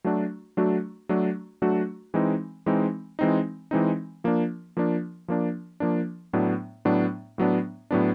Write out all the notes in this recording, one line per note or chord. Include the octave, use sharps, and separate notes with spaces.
F#3 A3 D4 F#4
F#3 A3 D4 F#4
F#3 A3 D4 F#4
F#3 A3 D4 F#4
E3 G#3 C4 D#4
E3 G#3 C4 D#4
E3 G#3 C4 D#4
E3 G#3 C4 D#4
F3 A#3 D4
F3 A#3 D4
F3 A#3 D4
F3 A#3 D4
A2 F#3 B3 D4
A2 F#3 B3 D4
A2 F#3 B3 D4
A2 F#3 B3 D4